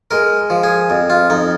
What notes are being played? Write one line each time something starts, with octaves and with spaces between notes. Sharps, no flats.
G#3 A#4
F3
G#4
F2
F4
F2 D#4